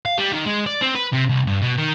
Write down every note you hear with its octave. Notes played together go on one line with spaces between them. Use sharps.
F5
G3
D#3
G#3
D5
C4
B4
C3
C2
G2
B2
D#3